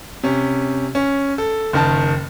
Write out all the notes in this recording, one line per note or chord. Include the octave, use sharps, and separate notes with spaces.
C3 C#4
C#4
A4
F#1 D#3 A5